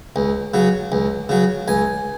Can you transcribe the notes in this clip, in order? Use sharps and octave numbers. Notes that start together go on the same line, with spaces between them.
C#2
C#3 F#3
C#2
C#3 F#3
C#2 G#5